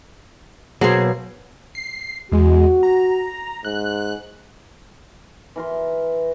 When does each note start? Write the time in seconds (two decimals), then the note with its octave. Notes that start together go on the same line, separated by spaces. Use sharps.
0.81 B2 F#3 A#3 G#4 C5
1.75 C7
2.32 E2 G#3 F#4
2.83 A#5
3.65 G#2 F#6
5.56 E3 A#4 C6